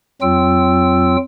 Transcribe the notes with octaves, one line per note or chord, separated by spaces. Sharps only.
F2 F#3 C4 F4 G5 E6